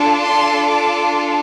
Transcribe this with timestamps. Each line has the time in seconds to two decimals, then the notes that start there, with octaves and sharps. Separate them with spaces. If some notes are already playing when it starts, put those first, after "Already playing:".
Already playing: D4 F4 A4
0.21 C6
0.68 D6